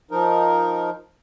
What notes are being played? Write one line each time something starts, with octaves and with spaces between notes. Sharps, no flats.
F3 D#4 A#4